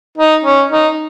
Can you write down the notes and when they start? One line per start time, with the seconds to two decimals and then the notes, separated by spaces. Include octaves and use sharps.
0.18 D#4
0.44 C#4
0.70 D#4